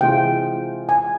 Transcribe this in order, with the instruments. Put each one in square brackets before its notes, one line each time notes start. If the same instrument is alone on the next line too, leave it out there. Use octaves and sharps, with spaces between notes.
[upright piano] C3 E3 G#3 C4 F4 [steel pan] G5
[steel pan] G#5